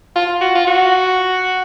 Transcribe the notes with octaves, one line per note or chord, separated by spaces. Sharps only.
F4
F#4
F4
F#4